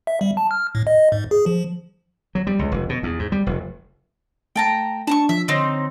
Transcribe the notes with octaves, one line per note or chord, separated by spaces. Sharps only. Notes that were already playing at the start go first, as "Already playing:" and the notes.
E5
G3
A5
F6
A2
D#5
G#2
G#4
F3
F#3
G3
C#2
F1
B2
E2
G#2
G3
F1
A3 G5 A5 A#5
D4 A5 A#5 C#6
F3 E5
D3 C4 D#4 C#5